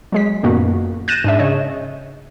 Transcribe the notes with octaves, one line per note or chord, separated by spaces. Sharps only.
F#3 G#3 B6
F#2 A#2 D#3 A#3 B3 F#4
F#6 G6 A6 A#6 D#7 E7
G#2 D4 E5
C#3 C#5 D#5